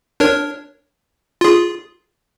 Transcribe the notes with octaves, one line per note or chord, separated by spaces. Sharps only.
D4 A#4 C#5
F4 G#4